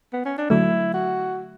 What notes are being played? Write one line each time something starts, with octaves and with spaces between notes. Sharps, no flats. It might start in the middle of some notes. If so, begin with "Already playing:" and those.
B3
C#4
D4
D3 F#3 A3 E4
F#4